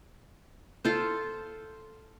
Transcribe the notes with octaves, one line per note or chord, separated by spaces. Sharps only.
F4 A4 C5